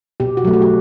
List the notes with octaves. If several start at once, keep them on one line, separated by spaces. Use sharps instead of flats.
B2 G4
F#4
F#3 A3
F#4
G4